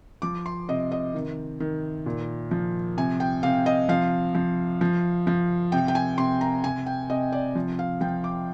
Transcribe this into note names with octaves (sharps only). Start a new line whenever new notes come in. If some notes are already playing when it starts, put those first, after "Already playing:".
F3 D6
C6
C3 D#5
D#5
D#3
D#3
A#2
F3
C3 G#5
G5
C3 F5
D#5
F3 F5
F3
F3
F3
C3 G5
G5
G#5
C3 C6
A#5
C3 G#5
G5
C3 D#5
D5
F3
F5
F3 G5
D6